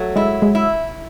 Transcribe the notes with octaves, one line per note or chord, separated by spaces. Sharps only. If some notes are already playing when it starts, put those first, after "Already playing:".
Already playing: F#3 A3
G#3 E4
G#3
E4